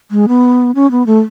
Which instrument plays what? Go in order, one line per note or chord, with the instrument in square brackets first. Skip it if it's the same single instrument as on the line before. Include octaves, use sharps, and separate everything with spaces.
[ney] G#3
B3
C#4
B3
A3